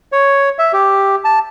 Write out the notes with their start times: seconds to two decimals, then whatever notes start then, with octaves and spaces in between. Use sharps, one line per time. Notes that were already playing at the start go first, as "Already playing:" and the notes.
0.12 C#5
0.59 E5
0.73 G4
1.24 A5